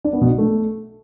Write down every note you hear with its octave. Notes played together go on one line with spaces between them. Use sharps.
D4
B3
B2
D4
A3